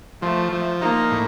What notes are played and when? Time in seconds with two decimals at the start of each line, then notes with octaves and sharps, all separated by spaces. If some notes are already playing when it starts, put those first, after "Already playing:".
0.22 F3 A3
0.52 F3
0.82 A#3 D#4
1.11 A2